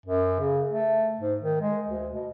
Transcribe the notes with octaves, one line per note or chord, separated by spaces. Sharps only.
F#2
C#3
A3
G#2
D#3
G#3
D2
B2